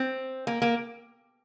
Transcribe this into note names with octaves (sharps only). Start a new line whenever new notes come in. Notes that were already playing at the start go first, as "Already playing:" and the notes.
Already playing: C4
A#3
A#3